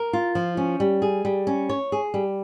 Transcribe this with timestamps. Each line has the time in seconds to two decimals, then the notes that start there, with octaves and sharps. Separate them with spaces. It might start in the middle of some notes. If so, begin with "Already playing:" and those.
Already playing: A#4
0.13 F4
0.35 F3
0.57 C#4
0.80 G3
1.02 G#4
1.25 G3
1.47 C#4
1.69 C#5
1.92 G#4
2.14 G3